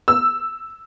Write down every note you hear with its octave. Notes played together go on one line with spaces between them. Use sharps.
E6